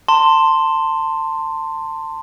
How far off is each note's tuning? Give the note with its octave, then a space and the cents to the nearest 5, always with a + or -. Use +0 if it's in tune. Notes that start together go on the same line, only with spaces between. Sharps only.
A5 +25 C6 +0